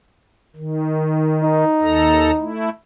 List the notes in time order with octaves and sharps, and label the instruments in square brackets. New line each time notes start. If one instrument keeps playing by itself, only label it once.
[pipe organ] D#3
[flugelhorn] D#4
[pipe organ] D#2 A4 A#5
A3 E4